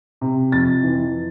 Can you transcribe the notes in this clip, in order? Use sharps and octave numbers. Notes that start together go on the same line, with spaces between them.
C3
F2 A6
E3